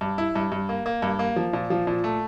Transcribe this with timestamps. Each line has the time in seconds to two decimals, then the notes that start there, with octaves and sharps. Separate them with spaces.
0.01 G2
0.18 E4
0.36 G2
0.52 G2
0.69 A#3
0.86 A#3
1.02 G2
1.19 A#3
1.36 F3
1.53 A#2
1.70 F3
1.87 A#2
2.04 A3